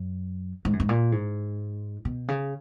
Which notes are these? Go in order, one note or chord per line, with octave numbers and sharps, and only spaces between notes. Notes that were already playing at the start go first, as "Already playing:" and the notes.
Already playing: F#2
G#2
F#2
G#2
A#2
G#2
B2
C#3